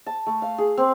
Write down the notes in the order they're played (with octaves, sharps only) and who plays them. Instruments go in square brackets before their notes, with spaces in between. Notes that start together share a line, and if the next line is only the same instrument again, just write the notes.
[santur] A5
A3
F5
G#4
C4